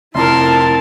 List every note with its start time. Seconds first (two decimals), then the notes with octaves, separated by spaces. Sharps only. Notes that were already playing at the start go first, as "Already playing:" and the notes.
0.15 F1 F2 E4 A#4 A5 A#5 C6